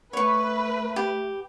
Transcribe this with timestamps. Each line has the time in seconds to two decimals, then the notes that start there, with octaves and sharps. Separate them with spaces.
0.13 A3 B4 C#5 C#6
0.96 G4